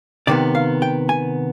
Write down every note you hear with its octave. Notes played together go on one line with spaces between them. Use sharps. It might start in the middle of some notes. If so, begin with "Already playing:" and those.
C3 D#3 B3 D5
F5
G5
G#5